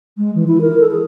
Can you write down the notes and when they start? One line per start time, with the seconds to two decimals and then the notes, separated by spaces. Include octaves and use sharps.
0.17 G#3
0.35 E3
0.48 E4
0.61 A#4
0.79 A4
0.91 G#4